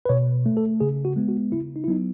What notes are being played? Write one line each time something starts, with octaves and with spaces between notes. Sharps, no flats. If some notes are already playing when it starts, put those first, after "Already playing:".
B4
B2 C#5
A3
A4
C#3 G#4
F#4
G#3 B3
F#4
C#3 E4
D#4
E4
F#3 B3 D#4